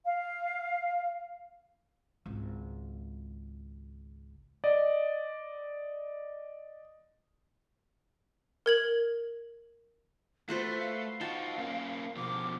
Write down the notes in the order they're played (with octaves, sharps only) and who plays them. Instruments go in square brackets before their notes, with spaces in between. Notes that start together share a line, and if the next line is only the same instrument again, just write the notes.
[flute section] F5
[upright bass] G#1 C#2
[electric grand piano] D5 D#5
[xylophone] A#4 G#6 F#7
[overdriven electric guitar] A3 [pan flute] F4 [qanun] F#4 B4 C5
[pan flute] F5
[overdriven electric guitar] D#4 F#4 [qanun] F4 G5 A5
[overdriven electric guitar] A#3 C#4
[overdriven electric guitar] B2 F3 [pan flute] D6